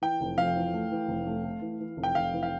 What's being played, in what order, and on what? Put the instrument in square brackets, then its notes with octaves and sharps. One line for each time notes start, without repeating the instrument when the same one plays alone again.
[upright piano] E3 [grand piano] G5
[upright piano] F1
[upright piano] F2 [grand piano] F5
[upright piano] E3
A3
E3
F1
A3
A3
E3
E3
F1
[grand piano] G5
[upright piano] F1 [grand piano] F5
[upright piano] E3
[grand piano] F5